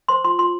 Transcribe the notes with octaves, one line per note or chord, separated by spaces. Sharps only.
C5 C6
F4 C6
F4 C6